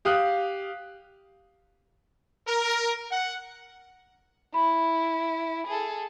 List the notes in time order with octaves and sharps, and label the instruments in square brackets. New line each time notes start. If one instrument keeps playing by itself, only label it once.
[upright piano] G4 F5 D#6 F#6
[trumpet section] A#4
F#5
[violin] E4 [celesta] B5
[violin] G#4 A4